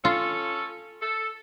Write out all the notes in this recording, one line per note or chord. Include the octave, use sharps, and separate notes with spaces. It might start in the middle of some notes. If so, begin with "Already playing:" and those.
C#4 F4 A4
A4